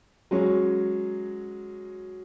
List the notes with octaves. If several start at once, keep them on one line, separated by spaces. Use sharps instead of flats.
F#3 G#3 C#4